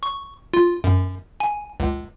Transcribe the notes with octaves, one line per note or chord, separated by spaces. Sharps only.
C#6
F4
F#2
G#5
C#2